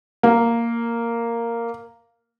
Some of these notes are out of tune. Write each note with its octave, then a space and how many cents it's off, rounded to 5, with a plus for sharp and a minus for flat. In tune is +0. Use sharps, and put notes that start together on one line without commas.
A#3 -5